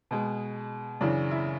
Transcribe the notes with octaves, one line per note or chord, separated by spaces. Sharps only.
B2 G#3
F#2 C#3 E3 D4
E4